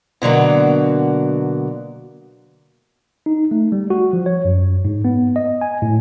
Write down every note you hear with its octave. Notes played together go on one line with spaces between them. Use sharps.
B2 D3 F#3 A#3
D#4
A3
G3
F#4
F3
C#5
F#2
G#2
B3
D#5
G#5
A2